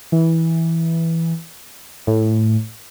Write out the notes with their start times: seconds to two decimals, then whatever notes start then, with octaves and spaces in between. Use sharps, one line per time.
0.12 E3
2.07 A2